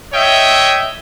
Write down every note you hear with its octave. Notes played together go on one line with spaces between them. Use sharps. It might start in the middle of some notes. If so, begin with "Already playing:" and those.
C#5 D#5 E5 G5